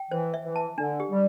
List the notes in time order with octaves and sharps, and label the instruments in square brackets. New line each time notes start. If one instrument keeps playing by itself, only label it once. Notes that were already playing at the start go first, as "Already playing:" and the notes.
Already playing: [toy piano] G5
[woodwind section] E3 [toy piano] C5
[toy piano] E5
[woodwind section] E3
[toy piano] A5
[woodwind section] D3 [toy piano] D4
[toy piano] G4
[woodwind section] G3